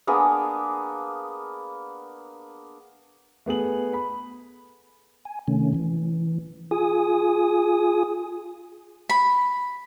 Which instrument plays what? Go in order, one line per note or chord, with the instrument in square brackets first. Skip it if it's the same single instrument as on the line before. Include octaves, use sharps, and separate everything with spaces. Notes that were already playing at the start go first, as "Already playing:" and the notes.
[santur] A#3 B3 D4 G#4
[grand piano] A3 B3 G#4 F#7
B5
[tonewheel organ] G#5
C3 D#3 A3 C#4
E3
F4 G#4 G#5 D#6
[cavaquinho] B5